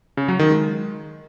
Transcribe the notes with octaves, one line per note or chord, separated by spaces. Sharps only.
C#3
F#3
D#3
G#3